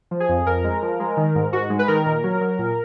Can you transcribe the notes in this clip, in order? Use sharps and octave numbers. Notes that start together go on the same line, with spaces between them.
F3
G#4
F2
F2 A#4
G#3
F3
G#3
D#3
G#2
G#2 F#4
G#3
B4
D#3 A#4
A#2
F#3
F#3
A#2